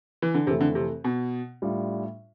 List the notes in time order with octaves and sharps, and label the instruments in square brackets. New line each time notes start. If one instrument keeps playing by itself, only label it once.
[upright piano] E3
D3
[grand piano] F2 E3 A3 [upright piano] C3
[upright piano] D3
C3
B2
[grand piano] A2 G3 D4 F4